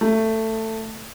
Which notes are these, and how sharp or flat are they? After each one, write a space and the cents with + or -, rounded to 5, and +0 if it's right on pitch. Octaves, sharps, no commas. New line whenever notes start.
A3 +15